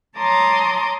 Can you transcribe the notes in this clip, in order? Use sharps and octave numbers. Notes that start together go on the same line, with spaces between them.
C#5 A5 A#5 C6 D6 D#6